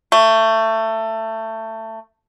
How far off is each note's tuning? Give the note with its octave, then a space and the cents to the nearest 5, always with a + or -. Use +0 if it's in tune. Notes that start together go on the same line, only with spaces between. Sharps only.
A3 +20